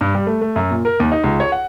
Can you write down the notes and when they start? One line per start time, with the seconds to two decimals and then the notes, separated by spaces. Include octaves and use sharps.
0.01 G2
0.15 G3
0.27 A3
0.41 A3
0.56 F#2
0.71 A#2
0.85 A#4
1.00 D#2
1.12 D#4
1.24 C#2
1.40 C#5
1.52 F#5